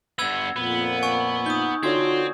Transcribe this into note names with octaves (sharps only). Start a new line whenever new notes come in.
G2 B3 E6 G#6
F2 A#2 B3
G#5 C#6
D#4 D#6 G6
D3 C4 D#4 F4 F#4 C#5 G#6